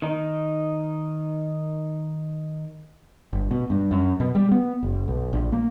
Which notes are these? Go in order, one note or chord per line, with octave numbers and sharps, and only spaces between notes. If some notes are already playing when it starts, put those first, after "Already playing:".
D#3 D#4
G1
B2
G2
F#2
B2
G3
B3
F#1
B1
A#1
A#3